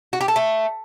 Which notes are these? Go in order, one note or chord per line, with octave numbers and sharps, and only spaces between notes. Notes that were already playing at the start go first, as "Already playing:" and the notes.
F#4
G4
A4
A3